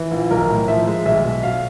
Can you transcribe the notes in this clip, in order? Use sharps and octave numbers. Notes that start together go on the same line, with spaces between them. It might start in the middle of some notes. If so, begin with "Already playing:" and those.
Already playing: E3
A#1
B1 A#4
A2
F3 E5
G#3
B1 E5
B2
F#3 F5